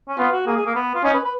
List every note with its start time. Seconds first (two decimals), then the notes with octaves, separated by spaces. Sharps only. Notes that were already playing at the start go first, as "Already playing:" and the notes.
0.08 C#4
0.18 B3 F4
0.33 F#4
0.46 A#3 G#4
0.57 G#4
0.66 A#3
0.75 B3
0.95 F4
1.04 C#4 D#4
1.14 B4
1.24 B4